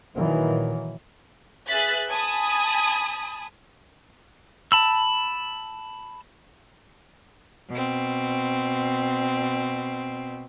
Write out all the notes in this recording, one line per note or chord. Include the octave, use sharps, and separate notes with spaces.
A#2 D#3 E3 F#3
G#4 B4 E5 F#6 A6 B6
G#5 A5 B5 D#6
A5 B5 E6
B2 C4